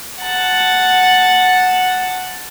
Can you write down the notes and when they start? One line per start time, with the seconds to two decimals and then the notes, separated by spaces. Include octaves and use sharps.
0.22 F#5 A5